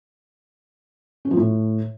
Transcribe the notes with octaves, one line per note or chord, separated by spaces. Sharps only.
C#4
F3
A2